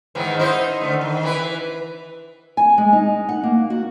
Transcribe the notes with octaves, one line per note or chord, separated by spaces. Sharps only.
G#2 D#3 E3
D#4 E4 C5
D3 A3
D#3
E3 B4
G#5
G#3
D#4
F#5
A#3
F#4